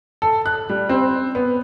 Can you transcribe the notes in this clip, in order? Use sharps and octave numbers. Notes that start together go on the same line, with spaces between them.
A4
F#6
G3
C4
B3